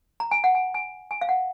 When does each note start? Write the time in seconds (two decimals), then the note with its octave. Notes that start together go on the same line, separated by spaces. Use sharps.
0.20 A#5
0.31 G#5
0.44 F#5
0.55 G#5
0.74 G#5
1.11 G#5
1.21 F5
1.29 F#5